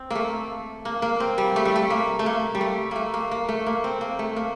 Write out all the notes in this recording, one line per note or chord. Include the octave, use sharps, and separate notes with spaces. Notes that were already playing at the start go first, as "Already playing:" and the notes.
Already playing: C4
A3 A#3
A#3
A#3
C4
G3
A3
G3
A3
A#3
A3
A#3
G3
A3
A3 A#3
A#3
A#3
A3
A#3
C4
A#3
A3
A#3